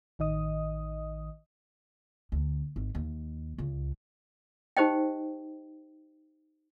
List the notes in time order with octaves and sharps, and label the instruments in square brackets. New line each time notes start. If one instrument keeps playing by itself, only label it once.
[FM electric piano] A1 D#3 D#5 D#6
[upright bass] D2
G#1
D#2
C#2
[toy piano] D#4 G4 C5 D#5 G5